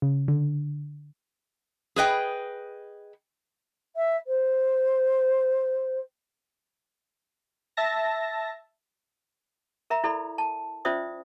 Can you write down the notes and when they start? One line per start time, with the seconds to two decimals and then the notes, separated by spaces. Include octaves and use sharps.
0.02 C#3
0.28 D3
1.96 G#4 B4 D#5 G5
3.96 E5
4.27 C5
7.77 E5 A5 A#6
9.90 A#4 E5 A#5
10.04 E4 A4 D5 B5
10.38 A5
10.85 C#4 F4 C5 D5 E5 D#6